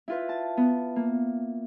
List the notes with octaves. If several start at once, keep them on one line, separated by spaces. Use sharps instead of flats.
E4 F4 B4
A5
B3
A#3